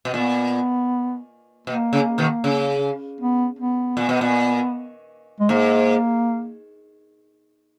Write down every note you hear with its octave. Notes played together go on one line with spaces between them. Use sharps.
B2
A#2 B3
B2 A#3
C#3
B2 D#3
C#3
B3
B3
A#2
B2
A#2
G#3
G#2 A#3